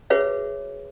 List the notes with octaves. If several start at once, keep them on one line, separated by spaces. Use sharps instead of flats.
F#4 G#4 B4 C#5 E5